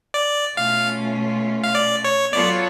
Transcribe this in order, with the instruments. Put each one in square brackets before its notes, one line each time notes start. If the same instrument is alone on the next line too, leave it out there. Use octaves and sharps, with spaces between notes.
[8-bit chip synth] D5
[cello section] B2 A3 C#4 F4 [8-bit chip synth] F5
[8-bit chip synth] F5
D5
C#5
[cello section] F#3 B3 F4 A4 C#5 [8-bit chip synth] D5